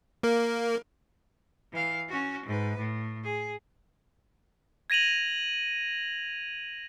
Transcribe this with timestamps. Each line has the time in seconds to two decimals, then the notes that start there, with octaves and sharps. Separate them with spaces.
0.23 A#3 A#4
1.73 E3 F5
2.08 C#4 F#4
2.46 G#2 B4
2.77 A2
3.24 G#4
4.90 G#6 A#6 D#7 F7 F#7